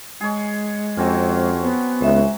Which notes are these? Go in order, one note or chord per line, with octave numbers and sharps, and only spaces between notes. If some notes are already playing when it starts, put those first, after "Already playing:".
G#3 G#4 C#5
F2 F#3 C4 C#4
B3
C#2 G#3 E5